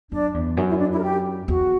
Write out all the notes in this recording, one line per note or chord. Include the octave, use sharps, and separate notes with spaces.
F#2 D4
E2
F#2 D4
E4
D4
E4
A#4
G4
E2 F#4